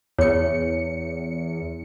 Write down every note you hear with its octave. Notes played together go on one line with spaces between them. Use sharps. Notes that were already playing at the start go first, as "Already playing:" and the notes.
E2 C#5 C#7